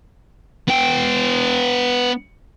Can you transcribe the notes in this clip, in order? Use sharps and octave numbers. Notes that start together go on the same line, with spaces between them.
B3 G5